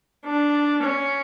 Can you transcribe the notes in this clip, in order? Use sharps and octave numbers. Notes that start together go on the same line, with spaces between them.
D4
C#4